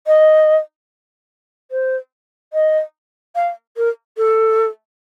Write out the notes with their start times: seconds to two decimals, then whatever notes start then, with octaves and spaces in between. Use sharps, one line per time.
0.07 D#5
1.71 C5
2.53 D#5
3.35 F5
3.77 A#4
4.17 A4